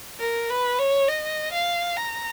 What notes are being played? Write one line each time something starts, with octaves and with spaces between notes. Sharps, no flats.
A#4
B4
C#5
D#5
F5
A#5